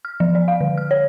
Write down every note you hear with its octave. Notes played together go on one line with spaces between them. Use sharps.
F6
F3
D5
F5
D3
F6
C#5